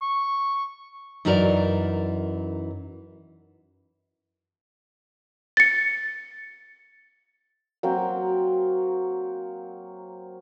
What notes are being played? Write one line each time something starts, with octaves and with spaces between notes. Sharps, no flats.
C#6
F#2 E3 D#4 F#4 A#4 D5
A6 C#7
F#3 A#3 C4